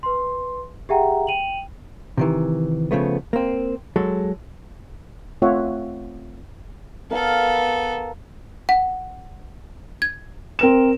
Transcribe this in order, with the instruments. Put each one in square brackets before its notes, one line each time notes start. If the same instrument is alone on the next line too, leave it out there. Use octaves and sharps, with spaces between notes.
[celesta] B4 C6
G4 G#4 E5 F#5 G5 A#5
G5 D#7 F7 F#7
[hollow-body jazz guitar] C3 D#3 E3
C#3 F3 A3 B3
A#3 C4
F#3 G#3 A4
[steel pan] A3 C4 F4 C#5 E5 F#5
[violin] B3 A4 [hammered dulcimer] A#4 F5 B5
[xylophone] F#5
G#6
[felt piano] C4 A#4 E7